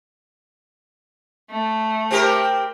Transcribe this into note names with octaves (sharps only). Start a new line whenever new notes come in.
A3
C4 G4 A#4